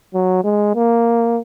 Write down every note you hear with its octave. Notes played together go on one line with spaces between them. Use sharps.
F#3
G#3
A#3